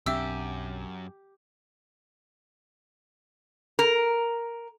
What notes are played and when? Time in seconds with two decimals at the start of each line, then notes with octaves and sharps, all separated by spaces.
0.06 B1 F#2 C4 D4 G4 E5 E6
3.79 A#4